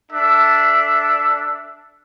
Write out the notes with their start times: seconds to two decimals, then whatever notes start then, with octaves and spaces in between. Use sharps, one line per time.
0.11 D4 A4 E5